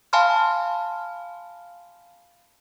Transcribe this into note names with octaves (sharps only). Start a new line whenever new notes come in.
F5 G#5 A5 B5 C6 F6